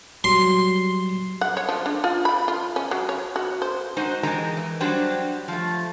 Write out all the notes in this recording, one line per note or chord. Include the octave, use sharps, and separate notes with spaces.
F#3 G3 C6
F#5
C#5
F3
D4
F4
B5
F4
C#4
F#3
C#5
F#4
C5
G#3 D#4 F#4 C5
E3 G#3 G4 A#4 D#5 A#5
E3
F#3 G3 D4 F#4 G4 C5
F3 A3